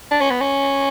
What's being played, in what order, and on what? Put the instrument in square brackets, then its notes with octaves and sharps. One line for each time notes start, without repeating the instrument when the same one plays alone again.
[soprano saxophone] D4
C#4
B3
C#4